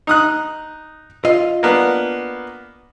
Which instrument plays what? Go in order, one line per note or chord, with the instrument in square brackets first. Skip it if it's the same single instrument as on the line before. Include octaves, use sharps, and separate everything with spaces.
[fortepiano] D#4 D#6 F#6
[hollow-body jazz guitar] F4 D#5
[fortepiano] A#3 B3 D4